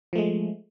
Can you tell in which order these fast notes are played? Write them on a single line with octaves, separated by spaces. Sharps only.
F3 A3 G#3